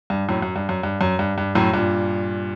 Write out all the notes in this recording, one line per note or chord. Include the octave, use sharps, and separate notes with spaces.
G2
F#2 A2
F#2
G2
F#2
G2
F#2
G2
G2
F#2 A2
G2 A#2